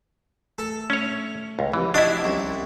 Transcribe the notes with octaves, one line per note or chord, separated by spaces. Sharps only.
A3 A4
A3 C#4 C#5
C#2
E3 F3 C4 G4
D4 E4 F#4 D#5 A5
C2 C#4